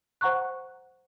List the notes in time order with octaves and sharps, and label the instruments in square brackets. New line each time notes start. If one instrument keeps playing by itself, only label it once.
[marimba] C5 F#5 A#5 C#6 F#6